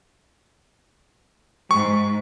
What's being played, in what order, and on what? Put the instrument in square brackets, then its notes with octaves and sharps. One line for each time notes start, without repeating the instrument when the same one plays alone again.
[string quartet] G#2 [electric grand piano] C#6